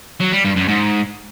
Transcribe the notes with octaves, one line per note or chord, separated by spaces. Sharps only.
F#3
G3
G2
F#2
G#2